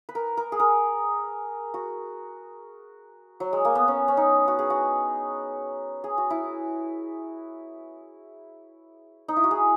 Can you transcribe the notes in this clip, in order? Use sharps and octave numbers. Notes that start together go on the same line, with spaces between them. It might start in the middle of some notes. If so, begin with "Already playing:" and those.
B4
A#4
A#4
G#4
A#4
F#4
F#3
G#3
A#3
B3
C#4
C#4
D#4
F#4
G#4
F#4
G#4
F#4
E4
D#4
E4
F#4
G#4